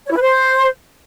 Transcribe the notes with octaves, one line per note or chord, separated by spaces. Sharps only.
C#5
E4
B4
C5